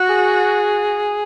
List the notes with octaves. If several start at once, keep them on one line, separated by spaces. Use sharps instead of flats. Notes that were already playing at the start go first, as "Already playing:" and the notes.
Already playing: F#4
G#4